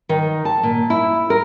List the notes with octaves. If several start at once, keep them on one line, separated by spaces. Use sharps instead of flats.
D#3
A5
A#2
E4
A#4